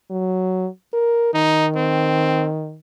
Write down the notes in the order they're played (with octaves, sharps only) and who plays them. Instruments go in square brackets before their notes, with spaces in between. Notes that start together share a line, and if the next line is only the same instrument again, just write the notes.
[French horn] F#3
A#4
[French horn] D#3 [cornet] D#4
[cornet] C4